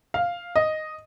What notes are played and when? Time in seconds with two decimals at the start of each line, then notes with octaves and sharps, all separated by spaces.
0.14 F5
0.56 D#5